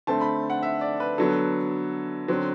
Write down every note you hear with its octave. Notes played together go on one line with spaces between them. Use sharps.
D3 A3 C4 A5
B5
F#5
E5
D5
B4
D3 F#3 B3 A4
D3 F#3 C4